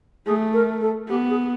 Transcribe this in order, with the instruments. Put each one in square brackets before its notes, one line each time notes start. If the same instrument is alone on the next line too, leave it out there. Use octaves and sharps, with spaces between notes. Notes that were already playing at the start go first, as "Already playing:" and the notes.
[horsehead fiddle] A3 [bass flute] G#4
[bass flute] A#4
A4
[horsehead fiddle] B3 [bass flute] G4
[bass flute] G#4